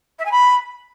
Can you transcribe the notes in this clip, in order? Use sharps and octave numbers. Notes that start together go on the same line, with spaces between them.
E5
G#5
B5